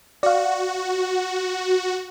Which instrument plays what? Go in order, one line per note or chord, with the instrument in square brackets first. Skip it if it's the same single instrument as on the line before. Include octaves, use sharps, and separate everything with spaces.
[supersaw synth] F#4 [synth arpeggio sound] D5 F5